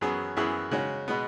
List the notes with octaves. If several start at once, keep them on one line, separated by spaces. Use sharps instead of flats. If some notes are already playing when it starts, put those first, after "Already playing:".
F#2 F#3 B3 G#4
F#2 E3 B3 E4 G#4
C#3 G#3 C#4 F#4
B2 G#3 B3